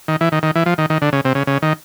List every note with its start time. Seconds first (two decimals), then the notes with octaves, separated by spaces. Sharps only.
0.08 D#3
0.21 E3
0.32 D#3
0.43 D#3
0.55 E3
0.66 F3
0.78 D#3
0.90 D#3
1.02 D3
1.13 C#3
1.25 C3
1.35 C#3
1.47 C#3
1.62 D#3